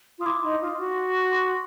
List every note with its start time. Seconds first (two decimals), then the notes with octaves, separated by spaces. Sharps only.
0.19 F4 D#6
0.26 E4 C6 D6
0.43 D#4
0.61 F4
0.79 F#4
1.32 C6 D6